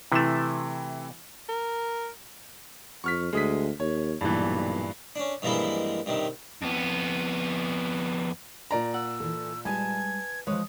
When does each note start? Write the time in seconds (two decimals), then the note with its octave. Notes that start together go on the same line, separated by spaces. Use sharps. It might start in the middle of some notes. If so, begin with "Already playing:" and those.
0.12 C3 E3 A3 E4 E7
1.49 A#4
3.04 F2 C#6 F6 B6
3.33 D2 G#3 D#6 B6
3.80 D#2 C#5
4.21 B1 G2 A#2 E3
5.16 C#4 D4
5.42 G2 E3 F3 G#3 A#3 E4
6.06 G2 C3 D#3
6.62 F2 B3
8.71 A#2 D5 A#5
8.94 F#5 E6
9.20 E3 A4
9.65 G3 G#3 B4 G#5 A5 G#6
10.47 F3 G#3 B4 C#5 D#6